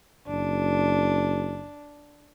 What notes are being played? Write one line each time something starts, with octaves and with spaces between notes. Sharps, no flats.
F#1 D4